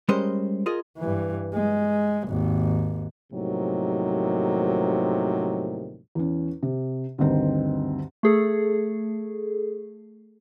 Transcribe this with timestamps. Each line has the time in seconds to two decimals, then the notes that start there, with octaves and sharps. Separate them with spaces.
0.09 G3 G#3 C#4 A#4 C5 D#5
0.66 F4 G#4 A#4 D#5
0.98 G2 E3
1.54 G#3
2.28 G#1 D#2
3.32 D#2 A2 C3 D#3 F3 F#3
6.15 E2 C#4
6.63 C3
7.18 D2 G2 D#3 C4
8.23 A3 G#4 A4